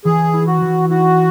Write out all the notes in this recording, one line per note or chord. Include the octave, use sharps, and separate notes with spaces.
E3 G#4
E4
F#4
E3
E4 F#4